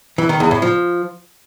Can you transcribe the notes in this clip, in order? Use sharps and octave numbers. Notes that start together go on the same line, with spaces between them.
E3
D#3
E2
A2
F3